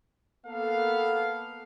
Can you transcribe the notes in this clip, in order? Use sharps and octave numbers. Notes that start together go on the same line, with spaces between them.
A#3 B3 A4 F5